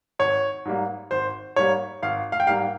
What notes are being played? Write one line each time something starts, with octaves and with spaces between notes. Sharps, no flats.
G#1 C#5
G#2 G3 A#3
G#1 C5
G#2 G3 A#3 C#5
G#1 F5
F5
G5
G#2 G3 A#3 F5